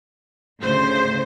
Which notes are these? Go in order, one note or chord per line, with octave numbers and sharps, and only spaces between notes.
D2 A2 C#3 C5